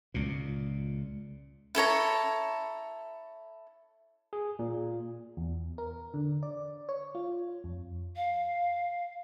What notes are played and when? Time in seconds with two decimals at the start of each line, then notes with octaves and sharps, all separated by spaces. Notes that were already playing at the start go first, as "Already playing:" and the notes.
0.14 C#2 A#2
1.75 E4 A4 C#5 A#5
4.33 G#4
4.59 A#2
5.37 E2
5.78 A#4
6.14 D3
6.43 D5
6.89 C#5
7.15 F4
7.64 F2
8.16 F5